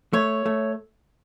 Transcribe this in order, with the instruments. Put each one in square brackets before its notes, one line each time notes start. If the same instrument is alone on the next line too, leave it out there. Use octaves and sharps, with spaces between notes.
[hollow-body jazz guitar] A3 [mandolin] C#5
[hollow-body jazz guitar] A3